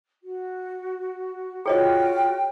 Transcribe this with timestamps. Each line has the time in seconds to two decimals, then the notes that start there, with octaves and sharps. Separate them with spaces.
0.22 F#4
1.66 F4 F#4 G#4 C#5 D#5 G5